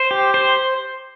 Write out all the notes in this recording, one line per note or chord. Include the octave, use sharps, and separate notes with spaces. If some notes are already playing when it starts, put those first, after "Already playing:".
Already playing: C5
G4
C5